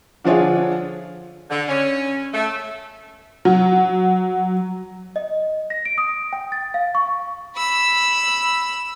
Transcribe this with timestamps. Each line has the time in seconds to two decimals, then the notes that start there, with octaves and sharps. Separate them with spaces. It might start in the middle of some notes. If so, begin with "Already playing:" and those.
0.24 D3 F3 D4 F4 G#4 C#5
1.50 D3
1.68 C#4
2.34 A3
3.45 F#3
5.16 D#5
5.70 A#6
5.85 D7
5.98 D#6
6.33 G5
6.52 A6
6.74 F5
6.95 C#6
7.56 B5 E6